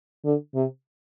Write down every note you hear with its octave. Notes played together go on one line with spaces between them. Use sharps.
D3
C3